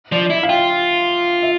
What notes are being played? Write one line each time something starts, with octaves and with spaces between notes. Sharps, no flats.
F3 D5
D5
E4 E5
F5
F4 G5
E5